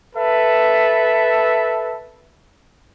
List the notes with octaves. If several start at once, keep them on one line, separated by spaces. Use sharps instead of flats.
A4 B4 E5